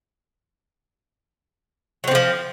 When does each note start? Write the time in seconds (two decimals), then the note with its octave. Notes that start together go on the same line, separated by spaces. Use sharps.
2.04 F#3
2.08 C4
2.11 D3
2.15 F3